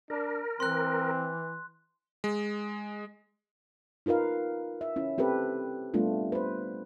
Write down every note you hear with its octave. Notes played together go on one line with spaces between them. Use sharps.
D4 A#4
E3 C4 C6 F#6
G#3
D#4 F4 A#4 B4 F5
E5
C#4 E4
C4 G4 A4 B4
G3 A3 B3 D4 F4
B4 C5